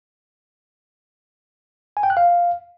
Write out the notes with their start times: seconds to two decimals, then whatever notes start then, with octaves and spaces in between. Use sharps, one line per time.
1.97 G#5
2.03 G5
2.10 F#6
2.17 F5